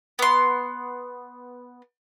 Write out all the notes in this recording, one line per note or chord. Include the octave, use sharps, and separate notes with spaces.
B3 C6